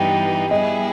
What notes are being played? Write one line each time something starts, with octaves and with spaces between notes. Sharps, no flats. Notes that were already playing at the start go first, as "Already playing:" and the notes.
Already playing: G2 E3 G3 B3 D#4 G5
G3 B3 E4 G#4 D#5